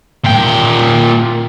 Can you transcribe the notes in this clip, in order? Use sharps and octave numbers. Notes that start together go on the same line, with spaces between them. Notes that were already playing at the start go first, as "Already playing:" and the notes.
A#2 G5